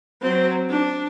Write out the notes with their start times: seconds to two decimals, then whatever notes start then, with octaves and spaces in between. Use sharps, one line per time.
0.22 F#3 C4
0.70 D4